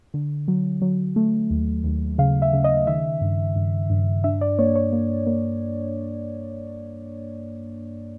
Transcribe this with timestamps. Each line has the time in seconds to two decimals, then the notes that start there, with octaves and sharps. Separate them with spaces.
0.14 D3
0.48 F#3
0.82 F#3
1.16 A3
1.50 D#2
1.84 D#2
2.18 C#3 F5
2.42 E5
2.53 C#3
2.64 D#5
2.87 D#3 E5
3.21 G2
3.56 G2
3.90 G2
4.24 D4 E5
4.41 D5
4.59 A#3 C#5
4.75 C#5
4.93 A#3
5.27 A#3